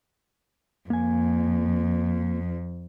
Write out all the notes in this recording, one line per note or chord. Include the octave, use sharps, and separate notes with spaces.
F2 A#3 G#5